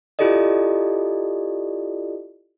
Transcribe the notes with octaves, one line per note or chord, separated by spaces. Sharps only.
E4 F4 G4 A4 D5 D#5